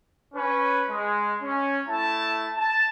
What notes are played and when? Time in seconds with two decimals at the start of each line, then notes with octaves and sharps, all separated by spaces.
0.34 C#4 B4
0.90 G#3
1.42 C#4
1.88 A3 E4 A5
2.57 A5